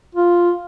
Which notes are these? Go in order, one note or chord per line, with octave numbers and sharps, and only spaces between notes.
F4